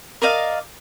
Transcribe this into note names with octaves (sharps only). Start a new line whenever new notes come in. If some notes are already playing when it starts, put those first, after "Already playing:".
A#4 D5 D#5 F5